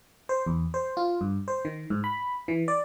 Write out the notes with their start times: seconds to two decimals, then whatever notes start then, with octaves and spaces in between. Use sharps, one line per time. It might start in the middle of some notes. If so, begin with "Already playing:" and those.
0.29 C5
0.46 E2
0.74 C5
0.97 F4
1.21 G2
1.48 C5
1.65 D#3
1.90 G#2
2.04 B5
2.48 E3
2.68 D5